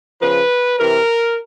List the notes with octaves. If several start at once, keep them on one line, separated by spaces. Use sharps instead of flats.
C#3 F3 B4
C3 E3 A#4